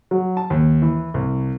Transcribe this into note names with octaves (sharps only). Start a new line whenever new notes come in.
F#3
A5
D#2
E3
C2